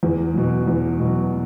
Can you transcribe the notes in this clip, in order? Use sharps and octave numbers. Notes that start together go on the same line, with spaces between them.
E2
B2 F#3
E2
B2
F#3